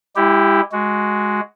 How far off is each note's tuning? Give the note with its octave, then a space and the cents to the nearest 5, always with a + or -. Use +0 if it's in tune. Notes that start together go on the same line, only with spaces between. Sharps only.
G#3 -40 E4 +0 G4 +0
G#3 +5 F#4 +0